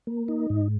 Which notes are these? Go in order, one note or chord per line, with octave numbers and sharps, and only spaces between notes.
A#3
D#4
G#2